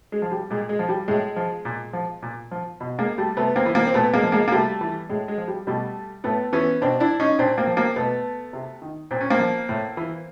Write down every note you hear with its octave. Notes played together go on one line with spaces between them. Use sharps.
G#3
F3
G3
A#2 G#3
G#3
F3
G3
A2 G#3
F3
A#2
F3
A#2
F3
B2
G#3 A#3
G3 A3
C3 A3 B3
A#3 C4
E3
A#3 C4
C4
A#2 A3 B3
G#3 A#3
F3
G#3 A#3
A#3
C3 G3 A3
E3
A2 G#3
G#3
F3
G3
B2 G3 A3
A2 A3 B3
E3 B3 C#4
B2 C4 D4
D4 E4
C#4 D#4
A#2 C4 D4
A#3 C4
F3
A#3 C4
B2 A3 B3
C3
D#3
A#2 C4
C#4
A#3 C4
F3
A2
E3